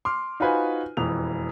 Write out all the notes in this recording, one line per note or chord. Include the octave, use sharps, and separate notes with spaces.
C6 D6 F6
D#4 F4 F#4 B4 C5 G#5
E1 F2 E3 F7